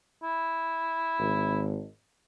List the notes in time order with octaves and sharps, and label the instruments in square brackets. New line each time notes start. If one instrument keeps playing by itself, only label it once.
[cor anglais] E4
[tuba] G#1